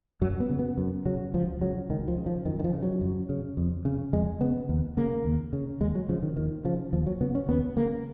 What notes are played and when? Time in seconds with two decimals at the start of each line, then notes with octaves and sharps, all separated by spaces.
0.21 F#2 F#3
0.40 B3
0.49 C#3
0.59 B3
0.78 F#2
1.05 C#3 F#3
1.34 C#2 F3
1.61 C#3 F#3
1.89 C#2 D#3
2.08 F3
2.18 C#3
2.26 F3
2.45 F#2 D#3
2.60 D#3
2.64 F3
2.73 C#3
2.83 F#3
3.01 F#2
3.29 C#3
3.57 F2
3.85 C#3
4.13 F2 G#3
4.41 C#3 B3
4.69 D#2
4.97 C#3 A#3
5.25 D#2
5.53 C#3
5.80 D#2 G#3
5.95 F#3
6.09 C#3 F3
6.23 D#3
6.37 D#2 D#3
6.65 C#3 F3
6.93 D#2 F3
7.06 F#3
7.21 C#3 B3
7.35 C#4
7.49 D#2 B3
7.76 C#3 A#3